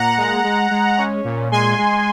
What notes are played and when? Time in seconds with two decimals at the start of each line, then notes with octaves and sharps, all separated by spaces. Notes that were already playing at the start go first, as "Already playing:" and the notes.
Already playing: A#2 F#5 A#5
0.18 G#3
0.44 G#3
0.71 G#3
0.98 C#4
1.25 A#2
1.52 G#3 G#5 C6
1.78 G#3